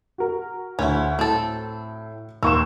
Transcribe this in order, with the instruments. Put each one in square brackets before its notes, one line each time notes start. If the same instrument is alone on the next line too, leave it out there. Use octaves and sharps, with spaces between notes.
[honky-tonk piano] F#4 A#4
[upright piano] D2 [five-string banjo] C#4 E4
[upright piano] A2 [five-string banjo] C4 A4
[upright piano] D#2 E7 [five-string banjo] A#3 [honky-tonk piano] C6 C#6 E6